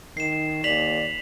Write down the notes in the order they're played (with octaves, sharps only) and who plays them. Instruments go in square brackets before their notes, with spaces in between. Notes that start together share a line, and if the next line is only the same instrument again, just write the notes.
[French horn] D#3 [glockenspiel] C7 E7
[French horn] D#2 [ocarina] D5 [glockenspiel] B6 F7 F#7